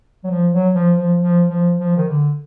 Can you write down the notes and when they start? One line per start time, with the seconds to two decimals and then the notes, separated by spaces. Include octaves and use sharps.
0.24 F#3
0.30 F3
0.53 F#3
0.75 F3
0.97 F3
1.20 F3
1.49 F3
1.79 F3
1.97 D#3
2.08 D3